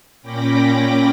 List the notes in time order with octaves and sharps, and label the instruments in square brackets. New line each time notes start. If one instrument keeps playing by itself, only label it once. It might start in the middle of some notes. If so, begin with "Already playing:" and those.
[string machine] A#2 C#4 G5 B5 D6 A#6